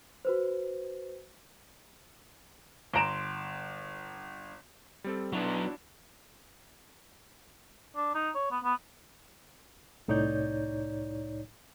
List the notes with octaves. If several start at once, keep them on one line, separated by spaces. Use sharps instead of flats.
F#4 B4 C5
G1 A#5 C6 D7 E7
G3 C4 A4
F#3 B3 D4 E4 F#4
D4
D#4
C#5
B3
B3
C2 A2 D#4 C#5 D5 G6